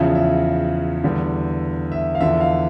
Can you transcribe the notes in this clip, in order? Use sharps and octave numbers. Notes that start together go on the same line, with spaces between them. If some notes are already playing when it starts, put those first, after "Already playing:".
Already playing: E2 C#3 F3 E5
E5
E2 D3 G3
E5
F5
E2 D3 F3 E5
F5